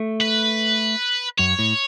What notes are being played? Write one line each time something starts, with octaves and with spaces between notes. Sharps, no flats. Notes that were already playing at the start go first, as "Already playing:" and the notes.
Already playing: A3
B4
F#2 C#5
A2